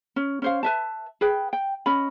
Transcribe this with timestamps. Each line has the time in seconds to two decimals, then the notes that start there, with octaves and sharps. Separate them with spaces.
0.16 C#4
0.42 C#4 C5 F5
0.63 B4 E5 A5
1.21 G#4 B4 G5
1.53 G5
1.86 C#4 D#5 B5